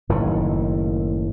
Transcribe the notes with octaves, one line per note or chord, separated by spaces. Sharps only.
F#1 A2 D#3